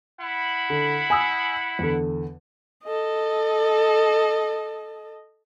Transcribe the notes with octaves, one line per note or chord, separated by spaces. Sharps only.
E4 F#5 B5
D3
G#5 D#6 E6
E2 D3
A4 D#5